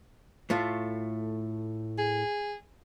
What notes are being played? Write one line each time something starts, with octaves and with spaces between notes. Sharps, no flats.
A2 A3 F4
G#4